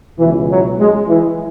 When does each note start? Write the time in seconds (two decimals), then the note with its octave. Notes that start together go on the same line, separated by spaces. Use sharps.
0.19 B2 E3
0.23 C#2
0.49 F#3
0.79 G#3
1.08 E3